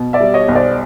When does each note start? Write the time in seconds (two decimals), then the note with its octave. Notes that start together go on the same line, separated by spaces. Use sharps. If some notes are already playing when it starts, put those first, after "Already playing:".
Already playing: B2
0.13 D5 E5
0.20 G3
0.34 C#5 D#5
0.48 B1
0.55 C5 D5